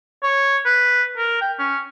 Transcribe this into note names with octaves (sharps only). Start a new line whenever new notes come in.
C#5
B4
A#4
G5
C#4